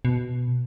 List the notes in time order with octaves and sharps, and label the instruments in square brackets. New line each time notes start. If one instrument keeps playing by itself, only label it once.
[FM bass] B2